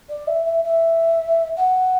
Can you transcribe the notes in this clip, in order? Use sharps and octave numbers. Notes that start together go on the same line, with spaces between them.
D5
E5
E5
E5
F#5